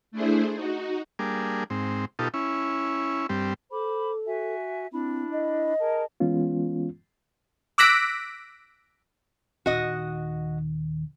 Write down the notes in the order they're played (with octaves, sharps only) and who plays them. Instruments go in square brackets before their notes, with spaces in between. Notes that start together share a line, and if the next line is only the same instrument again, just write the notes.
[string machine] A3 D4 E4 G#4 C5
D#4 F#4
[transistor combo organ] G3 A#3 D4 G#4
G#2 C4
B2 D#4 F4 G4 A4
C#4 E4
G2 G3 C4
[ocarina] A4 [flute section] C5 B5 D6
[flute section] F#4 E5 G#5
[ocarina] C4 [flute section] D4 E4 B5
[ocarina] D#5
[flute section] G#4 A#4 A5
[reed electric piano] E3 G#3 B3 C#4 F4
[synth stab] D6 E6 F#6 A#6 B6 D7
[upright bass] D#1 D#3 [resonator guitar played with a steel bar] F#4 D#5